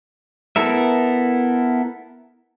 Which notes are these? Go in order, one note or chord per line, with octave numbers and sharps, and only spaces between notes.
B3 E4 A4 A#4 E5